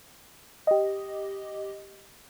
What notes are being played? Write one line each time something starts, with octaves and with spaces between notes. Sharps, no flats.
G4 D#5